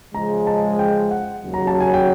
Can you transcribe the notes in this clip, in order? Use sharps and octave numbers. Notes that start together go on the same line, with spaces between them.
C#3 F3 G#3 A#5
A5
G5
F#5
D#2 C#3 F#3
A#5
A5
G#5
G5